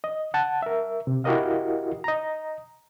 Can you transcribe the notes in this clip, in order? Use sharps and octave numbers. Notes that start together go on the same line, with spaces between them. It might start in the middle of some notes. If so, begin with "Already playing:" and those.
D#5
F#5 A5
A#4 E5
C3
E4 F#4 G4 A#4 D#5 F5
D#5 A#5